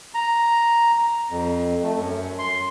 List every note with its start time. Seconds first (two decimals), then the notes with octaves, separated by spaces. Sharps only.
0.14 A#5
1.30 F2
1.83 A3
1.96 F#2
2.39 C6